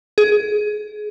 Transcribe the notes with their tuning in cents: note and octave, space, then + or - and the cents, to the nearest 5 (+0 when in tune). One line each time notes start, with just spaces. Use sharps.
G#4 +20